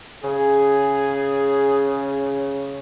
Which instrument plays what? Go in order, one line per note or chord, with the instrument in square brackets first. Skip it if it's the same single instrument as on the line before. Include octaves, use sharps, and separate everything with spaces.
[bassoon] C#3 [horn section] G#4